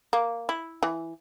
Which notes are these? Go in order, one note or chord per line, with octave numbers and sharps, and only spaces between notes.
A#3
E4
E3